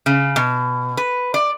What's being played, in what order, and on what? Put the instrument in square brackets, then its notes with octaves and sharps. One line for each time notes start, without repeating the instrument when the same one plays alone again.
[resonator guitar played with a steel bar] C#3
B2
B4
D5